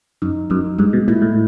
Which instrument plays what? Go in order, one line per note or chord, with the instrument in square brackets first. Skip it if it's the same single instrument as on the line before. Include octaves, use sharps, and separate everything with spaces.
[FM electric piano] F#2 [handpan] D#4
[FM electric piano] F#2 [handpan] D#4
[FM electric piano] G2 [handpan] G#3
[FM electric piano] B2
[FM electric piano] A#2 [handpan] E4
[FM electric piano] A2